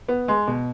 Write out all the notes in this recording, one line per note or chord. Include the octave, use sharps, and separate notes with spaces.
B3
G#3
B2